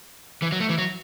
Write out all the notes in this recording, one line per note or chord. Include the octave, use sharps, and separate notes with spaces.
E3
F#3
A3
E3
F#3